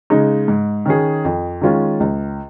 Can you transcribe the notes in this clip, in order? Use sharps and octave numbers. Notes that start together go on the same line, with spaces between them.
C#3 G#3 D#4
G#2
D#3 C#4 G#4
F2
D#3 G#3 C#4 F4
C#2